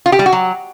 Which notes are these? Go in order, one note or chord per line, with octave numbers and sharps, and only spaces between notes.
F4
G4
G3
F#4
F#3